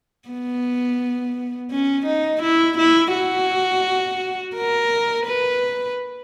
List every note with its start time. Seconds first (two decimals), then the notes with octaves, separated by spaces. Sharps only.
0.29 B3
1.71 C#4
2.06 D#4
2.43 E4
2.78 E4
3.13 F#4
4.56 A#4
5.26 B4